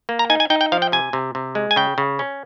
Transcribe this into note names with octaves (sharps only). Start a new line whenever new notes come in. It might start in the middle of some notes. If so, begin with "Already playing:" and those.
A#3
A#5
D#4 G#5
G#5
D#4 G5
G5
F3 F5
G5
C3 G#5
C3
C3
G#3
G#5
C#3 G5
C#3
C#4